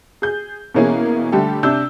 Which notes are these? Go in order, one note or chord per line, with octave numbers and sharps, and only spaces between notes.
G#4 G6
B2 E3 A#3 C#4 G#4
D3 G3 A3 G4 A4
C3 D4 E6 G6